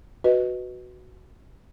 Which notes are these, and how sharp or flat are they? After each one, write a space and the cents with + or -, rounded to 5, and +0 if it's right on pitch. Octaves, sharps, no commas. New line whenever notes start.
F#4 +0 B4 +0 D#5 +0